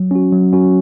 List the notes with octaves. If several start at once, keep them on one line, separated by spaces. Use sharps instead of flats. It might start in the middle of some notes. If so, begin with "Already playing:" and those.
Already playing: F#3
C#4 F#4
F#3
C#4 F#4